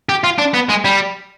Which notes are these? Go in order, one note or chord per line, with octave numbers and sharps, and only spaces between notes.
G4
F4
D4
B3
G#3
G3